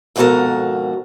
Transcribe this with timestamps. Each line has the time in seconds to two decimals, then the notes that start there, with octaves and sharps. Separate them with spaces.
0.16 F2 G#2 B2 F#4 A4 A#4